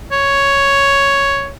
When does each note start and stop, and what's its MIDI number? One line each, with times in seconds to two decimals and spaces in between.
0.12 1.50 73